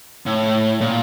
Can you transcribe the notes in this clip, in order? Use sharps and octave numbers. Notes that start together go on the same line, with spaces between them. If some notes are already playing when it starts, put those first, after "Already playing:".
A2
A#2